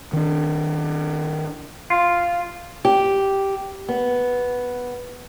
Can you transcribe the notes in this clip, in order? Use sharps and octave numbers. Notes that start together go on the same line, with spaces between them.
D#3 D4
F4
G4
B3